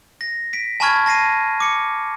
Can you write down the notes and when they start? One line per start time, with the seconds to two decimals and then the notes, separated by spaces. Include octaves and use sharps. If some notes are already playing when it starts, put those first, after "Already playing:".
0.21 A#6
0.53 B6 D7
0.80 G#5 A5 B5 C#6 F6 G#6
1.06 A5 A#6 C7 D#7
1.60 D6 C#7